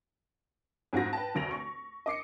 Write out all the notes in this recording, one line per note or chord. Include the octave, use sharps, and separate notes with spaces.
F2 G#2 F4 F#4 A#6
B4 G5 A5
F1 D2 A#6 F7
C#6
D#5 D6 C7 C#7